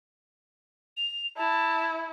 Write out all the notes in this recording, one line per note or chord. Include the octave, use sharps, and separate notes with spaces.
F7
E4 A5